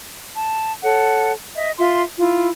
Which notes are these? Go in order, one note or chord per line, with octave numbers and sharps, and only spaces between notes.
A5
A4 C#5 F#5
D#5 E5
F4 E5 C6
E4 F4